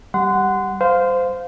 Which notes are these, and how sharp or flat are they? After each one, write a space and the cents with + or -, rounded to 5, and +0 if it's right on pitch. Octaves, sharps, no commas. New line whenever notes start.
G3 +0 F#5 +0 C6 -30
C5 -20 F5 +10